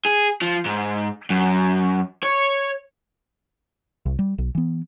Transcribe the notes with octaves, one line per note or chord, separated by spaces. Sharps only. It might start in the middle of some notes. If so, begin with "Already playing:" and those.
G#4
F3
G#2
F#2
C#5
C2
G3
B1
E3 B3